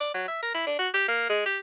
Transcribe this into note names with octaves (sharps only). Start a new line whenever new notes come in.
D5
F#3
E5
A#4
E4
D4
F#4
G4
A#3
G#3
G4